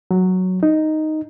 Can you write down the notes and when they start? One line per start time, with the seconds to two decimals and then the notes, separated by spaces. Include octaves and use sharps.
0.11 F#3
0.63 D#4